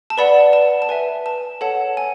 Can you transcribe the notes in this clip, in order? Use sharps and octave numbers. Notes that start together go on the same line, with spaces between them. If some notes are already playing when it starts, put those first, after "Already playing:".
A5
B4 D5 F#5 B5
A5
A5
B4 E5 G#5
A5
A4 C#5 F#5 A5
G#5